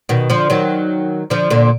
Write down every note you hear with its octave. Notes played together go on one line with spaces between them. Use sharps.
B2 D#3
D3 F3
D#3 F#3
D3 F3
A#2 D3